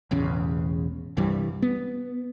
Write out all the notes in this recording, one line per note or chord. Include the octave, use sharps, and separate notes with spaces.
E1 A1 E2 C#3
C2 G2 E3 G3
B3